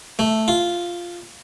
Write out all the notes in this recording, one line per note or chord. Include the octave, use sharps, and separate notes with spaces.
A3
F4